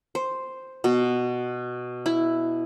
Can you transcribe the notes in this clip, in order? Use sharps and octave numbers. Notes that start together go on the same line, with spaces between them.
C5
B2
E4